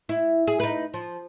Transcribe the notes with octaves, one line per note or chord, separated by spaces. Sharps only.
E4
G#4
D#4 B4
F3